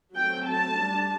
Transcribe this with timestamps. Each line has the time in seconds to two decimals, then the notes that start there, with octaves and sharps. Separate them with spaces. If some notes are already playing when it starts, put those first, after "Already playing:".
0.14 F#3 A3 C4 G5
0.45 A5
0.77 G3 D4